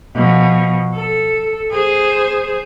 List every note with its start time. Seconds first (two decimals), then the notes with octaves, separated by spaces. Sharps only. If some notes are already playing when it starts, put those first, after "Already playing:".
0.15 B2 F3
0.94 A4
1.71 G#4 C5